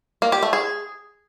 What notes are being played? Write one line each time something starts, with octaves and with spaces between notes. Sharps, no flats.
A#3
G4
A3
G#4